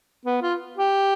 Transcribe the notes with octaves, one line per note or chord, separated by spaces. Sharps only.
B3
F4
G4